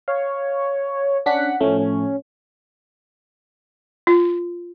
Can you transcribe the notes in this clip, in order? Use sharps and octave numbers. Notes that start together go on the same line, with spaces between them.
C#5 F5
C#4 D4 F#5 B6
A2 F3 A3 C#4
C#4
F4